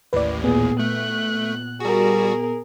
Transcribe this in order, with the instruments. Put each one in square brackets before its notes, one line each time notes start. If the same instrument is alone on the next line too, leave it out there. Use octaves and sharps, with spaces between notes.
[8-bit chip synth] A1 D#2 A2 [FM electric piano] B4 D5
[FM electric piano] A#2 B3 [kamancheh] G#4
[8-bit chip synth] A3 [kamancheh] F#6
[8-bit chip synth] G3 F#4 [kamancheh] G#4 A#4